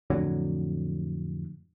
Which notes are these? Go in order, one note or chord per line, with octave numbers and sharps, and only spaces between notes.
F2 A2 D3 F#3